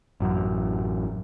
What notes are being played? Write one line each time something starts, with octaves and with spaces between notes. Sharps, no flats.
A1 F#2